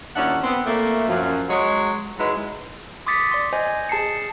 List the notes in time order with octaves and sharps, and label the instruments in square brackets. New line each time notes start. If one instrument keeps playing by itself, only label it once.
[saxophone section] D#2 A#2 C#4 D4 E4 F#5
B3 C4
A#2 A3 A#3
F#2 F3
F#3 G#3 C#5
F#3 G#3 D#4 E4 G#4 B4
[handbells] C6 D6 D#6 A6 B6 C#7
D5 C6
C5 D#5 G#5
G#4 A5 C7 C#7